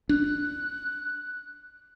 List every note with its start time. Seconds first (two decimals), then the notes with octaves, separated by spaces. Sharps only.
0.09 D4 F#6